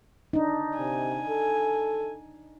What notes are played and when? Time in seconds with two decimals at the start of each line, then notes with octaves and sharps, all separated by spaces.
0.33 D4 D#4
0.77 C3 G#5
1.29 A4